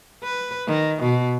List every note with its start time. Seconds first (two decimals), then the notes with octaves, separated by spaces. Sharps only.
0.24 B4
0.68 D#3
1.03 B2